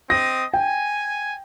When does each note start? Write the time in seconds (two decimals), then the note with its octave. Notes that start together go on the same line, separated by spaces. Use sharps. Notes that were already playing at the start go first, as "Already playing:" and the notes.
0.10 C4 D#5 D#6 A#6
0.54 G5 G#5